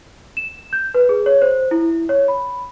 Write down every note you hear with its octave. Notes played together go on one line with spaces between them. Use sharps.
E7
G6
B4
G#4
C#5
C5
E4
C#5
B5